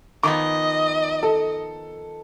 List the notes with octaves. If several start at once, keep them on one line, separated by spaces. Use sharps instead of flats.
D#3 F3 B3 D#5 D6
A4